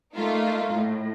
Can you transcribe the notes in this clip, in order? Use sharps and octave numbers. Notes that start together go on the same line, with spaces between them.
A3 A#3 D#4 F4
A2